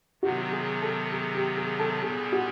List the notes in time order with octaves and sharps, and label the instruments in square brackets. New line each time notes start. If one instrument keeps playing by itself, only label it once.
[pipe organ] C3 D#3 F#3 B3 [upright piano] F#4
[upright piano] G#4
A4
G#4
G4
G#4
A4
[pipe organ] A#2 G3 B3 [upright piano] G#4
[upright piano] F#4